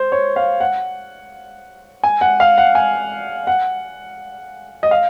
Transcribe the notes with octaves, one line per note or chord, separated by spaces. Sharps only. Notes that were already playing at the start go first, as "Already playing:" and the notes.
Already playing: C5
C#5
F5
F#5
G#5
F#5
F5
F#5
G#5
F#5
D#5
F5